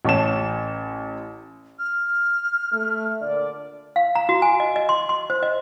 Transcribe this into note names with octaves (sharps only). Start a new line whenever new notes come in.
A1 C#5 A5 E7
F6
A3
A#2 D3 D5
F5
A#5
F#4
G#5
D#5
D#5
C6
C6
C5
D#5